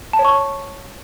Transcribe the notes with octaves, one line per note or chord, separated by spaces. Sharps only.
A5
C#5
C#6